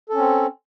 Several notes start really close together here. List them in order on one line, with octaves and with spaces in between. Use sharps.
A4 C#4 C4